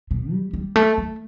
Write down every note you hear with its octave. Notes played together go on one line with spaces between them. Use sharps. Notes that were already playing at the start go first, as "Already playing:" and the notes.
B2
G3
G3
A3
A3